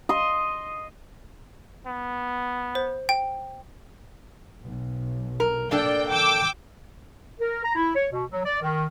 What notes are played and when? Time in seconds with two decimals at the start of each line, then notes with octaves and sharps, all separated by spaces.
0.09 D#5 C6
1.87 B3
2.75 C5
3.09 G5
4.62 B1
5.40 A#4
5.71 A#3 D4 A4 D5 G5
6.09 G5 D6 E6
7.41 A#4
7.64 A#5
7.76 E4
7.96 C#5
8.12 B2
8.32 F#3
8.46 D5
8.62 D#3